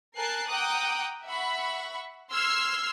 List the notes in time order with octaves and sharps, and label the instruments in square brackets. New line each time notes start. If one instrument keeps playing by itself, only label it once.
[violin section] A#4 G#5 A5 F#6 C7
F#5 G5 A#5 D6 D#6 F#6
E5 F#5 B5 C#6
C6 E6 F6 G#6 C7